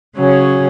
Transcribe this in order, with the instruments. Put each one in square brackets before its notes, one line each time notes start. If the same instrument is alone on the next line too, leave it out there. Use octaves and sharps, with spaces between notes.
[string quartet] C#3 F#3 C#4 G#4